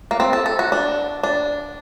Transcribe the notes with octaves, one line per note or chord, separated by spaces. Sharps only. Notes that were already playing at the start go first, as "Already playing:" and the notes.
A#3
C4
A4
A4
F#4
D4
D4